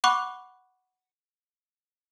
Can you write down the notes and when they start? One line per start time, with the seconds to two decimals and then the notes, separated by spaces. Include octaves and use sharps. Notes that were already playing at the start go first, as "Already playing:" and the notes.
0.04 F#5 B5 C#6 D6 F#6